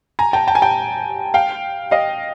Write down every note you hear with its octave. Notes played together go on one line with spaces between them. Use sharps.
G#5 A#5
G5 A5
G5 A5
G#5
G5 A5
F5 G5
D#5 F5